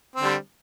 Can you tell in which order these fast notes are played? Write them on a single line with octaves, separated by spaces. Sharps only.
C4 D3 G3